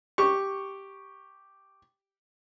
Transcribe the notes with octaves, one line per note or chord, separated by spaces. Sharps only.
G4 C#6